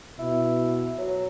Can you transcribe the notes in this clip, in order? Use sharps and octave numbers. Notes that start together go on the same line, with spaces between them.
B2 E4
F#3